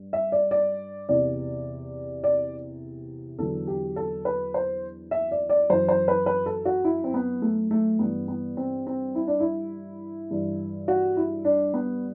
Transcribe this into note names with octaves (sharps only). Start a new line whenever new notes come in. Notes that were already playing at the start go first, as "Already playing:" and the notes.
Already playing: G2
E5
D5
D5
E2 C3 E3 D5
D5
E2 D3 F#3 A4
G4
A4
B4
C5
E5
D5
D5
F#2 E3 C5
C5
B4
B4
A4
F#4
E4
C4
B3
A3
A3
G2 E3 B3
B3
C4
C4
E4
D4
E4
G2 E3
F#4
E4
D4
B3